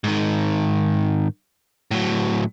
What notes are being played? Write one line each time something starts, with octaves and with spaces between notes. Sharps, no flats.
G#2 D#3
A2 F#3